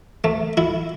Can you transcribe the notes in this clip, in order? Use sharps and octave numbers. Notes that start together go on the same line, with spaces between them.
A3
E4